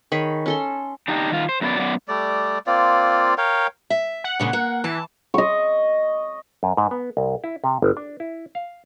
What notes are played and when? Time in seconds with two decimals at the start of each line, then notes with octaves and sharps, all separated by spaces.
0.12 D#3 G#4 C#5 B5
0.46 C#4 A4 C6
1.08 D4 D#4 G4
1.31 D#3 F4
1.49 C5
1.61 F#2 F#3 B3 F4 D5
1.79 F#2 B3 D5
2.08 G3 A3 D5
2.67 A#3 C4 F4 D5
3.38 A#4 C#5 F5 G5
3.90 E5
4.24 F#5
4.40 A#2 C#3 G#3
4.53 A#3
4.84 E3 A5
5.34 D#5 C#6
6.63 F#2
6.77 G#2
6.91 B3
7.17 C2
7.44 E4
7.64 C3
7.82 G1
7.97 D4
8.20 E4
8.55 F5